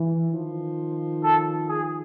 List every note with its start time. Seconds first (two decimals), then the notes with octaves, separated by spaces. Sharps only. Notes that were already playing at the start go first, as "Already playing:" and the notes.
Already playing: E3
0.33 D#3 F3
1.24 A4
1.68 G#4